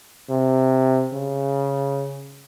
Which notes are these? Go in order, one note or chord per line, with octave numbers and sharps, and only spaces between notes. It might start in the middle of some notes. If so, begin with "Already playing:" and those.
C3
C#3